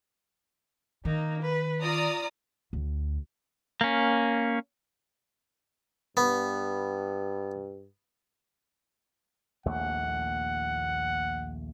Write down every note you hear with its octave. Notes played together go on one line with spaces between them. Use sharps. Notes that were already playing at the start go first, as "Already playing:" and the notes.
D#3 A#3 D#4
B4
F4 D5 A#5 D#6
D2
A#3 C#4
G2 B3
A#1 D#2 A3 F#5